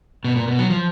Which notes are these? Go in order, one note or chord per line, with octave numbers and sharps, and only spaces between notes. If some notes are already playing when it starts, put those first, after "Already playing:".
B2
A#2
B2
F#3
F3